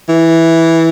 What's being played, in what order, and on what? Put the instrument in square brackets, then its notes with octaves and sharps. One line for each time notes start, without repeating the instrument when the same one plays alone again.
[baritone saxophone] E3